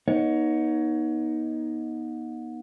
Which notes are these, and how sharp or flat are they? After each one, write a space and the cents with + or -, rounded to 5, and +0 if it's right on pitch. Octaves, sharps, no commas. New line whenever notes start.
B3 -35 D#4 +10 C#5 +15